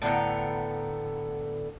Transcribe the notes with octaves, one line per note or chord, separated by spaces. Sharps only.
A2 D3 B3 A#5